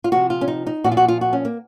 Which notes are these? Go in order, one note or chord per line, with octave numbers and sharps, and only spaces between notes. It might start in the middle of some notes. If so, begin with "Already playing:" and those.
F4
C3 F3 F#4
F4
C#4
D#4
D#4
A#2 F3 F#4
F4
F#4
F4
F#4
C#4
A#3